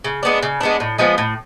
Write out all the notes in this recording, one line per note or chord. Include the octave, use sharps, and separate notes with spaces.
C#3
G#3 B3 D4
C#3
G#3 B3 D4
A2
F3 G#3 B3
A2